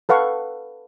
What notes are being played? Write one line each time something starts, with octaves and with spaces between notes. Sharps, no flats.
A4 B4 F5 F#5 C#6